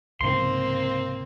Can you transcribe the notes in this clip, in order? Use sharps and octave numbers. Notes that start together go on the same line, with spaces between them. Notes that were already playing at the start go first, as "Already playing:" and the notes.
C2 G#2 C#3 A#3 C4 C6